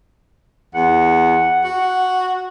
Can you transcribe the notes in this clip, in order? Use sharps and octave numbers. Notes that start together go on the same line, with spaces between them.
E2 F#5
F#4